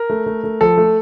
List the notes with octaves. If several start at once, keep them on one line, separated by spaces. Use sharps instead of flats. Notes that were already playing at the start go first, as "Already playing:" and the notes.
Already playing: A#4
A3
A3
A3
F3 A4
A3